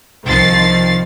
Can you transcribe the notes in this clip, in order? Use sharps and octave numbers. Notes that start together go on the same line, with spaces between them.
C2 D#3 F3 C4 A6 C7